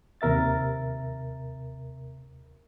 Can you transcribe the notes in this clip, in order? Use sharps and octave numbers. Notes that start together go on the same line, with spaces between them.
D#2 C3 A#4 E5 A6